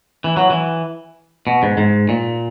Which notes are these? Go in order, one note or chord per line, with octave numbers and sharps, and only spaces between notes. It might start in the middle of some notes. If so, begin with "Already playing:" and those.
E3
F#3
E3
B2
G#2
G#2
A#2